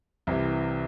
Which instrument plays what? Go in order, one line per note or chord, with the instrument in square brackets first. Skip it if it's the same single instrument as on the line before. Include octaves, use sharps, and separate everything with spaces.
[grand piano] C2 C3 E3